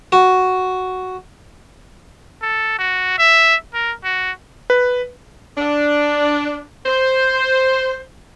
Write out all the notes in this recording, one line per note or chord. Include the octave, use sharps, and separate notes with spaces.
F#4
A4
F#4
E5
A#4
F#4
B4
D4
C5